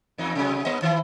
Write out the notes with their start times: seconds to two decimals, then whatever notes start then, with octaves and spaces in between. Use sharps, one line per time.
0.18 E2 D#4
0.35 C3 F#3 G#3
0.65 G#2 A#3 D#5
0.82 D#3 E3 E4